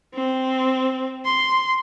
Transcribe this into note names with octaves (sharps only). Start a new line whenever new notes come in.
C4
C6